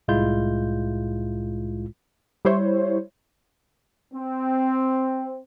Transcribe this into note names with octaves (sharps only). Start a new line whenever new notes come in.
C2 A2 G#3 E4 F4 G6
G3 E4 C5 C#5
C4